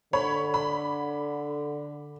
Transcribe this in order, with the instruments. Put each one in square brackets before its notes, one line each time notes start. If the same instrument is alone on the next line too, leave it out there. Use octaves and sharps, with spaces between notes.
[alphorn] D3 [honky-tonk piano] C#5 B5
[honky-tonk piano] B5